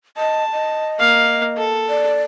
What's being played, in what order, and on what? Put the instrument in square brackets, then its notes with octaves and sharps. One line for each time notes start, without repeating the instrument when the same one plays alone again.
[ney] D#5 [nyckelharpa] A5
[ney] D#5
[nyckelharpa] A#3 F5
A4
[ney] D5